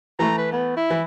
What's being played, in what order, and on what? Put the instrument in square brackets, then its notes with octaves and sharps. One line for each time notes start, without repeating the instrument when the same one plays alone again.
[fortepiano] E3 A3 [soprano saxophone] A#5
[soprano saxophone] B4
B3
E4
[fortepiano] E3